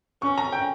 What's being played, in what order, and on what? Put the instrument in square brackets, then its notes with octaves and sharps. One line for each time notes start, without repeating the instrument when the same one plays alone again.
[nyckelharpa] C#4 [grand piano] C#6
[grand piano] A#5
G5